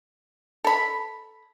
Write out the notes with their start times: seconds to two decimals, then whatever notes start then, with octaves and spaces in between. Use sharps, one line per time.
0.64 A4 B5